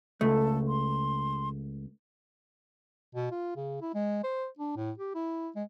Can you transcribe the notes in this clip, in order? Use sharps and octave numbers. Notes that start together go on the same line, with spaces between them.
C#2 A3 A4
C6
B2
F4
C#3
E4
G#3
C5
D4
A2
G4
E4
G#3